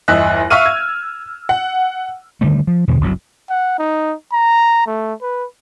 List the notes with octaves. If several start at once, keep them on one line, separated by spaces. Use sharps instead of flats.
G1 E2 D#5 E5 F#6
E5 F5 C#6 E6 F6 D#7
G#6
F#5
D3 D#3 G3 A3
F3
E2 B2 D3 E3
F#1 C2 B2 F#3
F#5
D#4
A#5
A3
B4